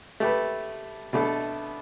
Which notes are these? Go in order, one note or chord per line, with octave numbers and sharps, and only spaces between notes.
A3 G4 B4
B2 A3 D4 A4